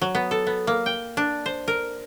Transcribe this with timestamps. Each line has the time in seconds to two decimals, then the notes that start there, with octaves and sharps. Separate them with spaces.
0.01 F#3
0.15 B3
0.31 A4
0.47 B3
0.67 A#3
0.86 G5
1.17 D4
1.46 C5
1.68 A#4